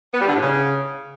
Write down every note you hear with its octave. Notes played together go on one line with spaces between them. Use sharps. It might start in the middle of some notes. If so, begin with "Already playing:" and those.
B3
G3
D3
A2
C#3